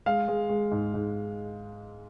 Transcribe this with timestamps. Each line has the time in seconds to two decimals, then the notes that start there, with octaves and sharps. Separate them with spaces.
0.06 G#3 F5
0.28 G#3
0.49 G#3
0.71 G#2
0.94 G#2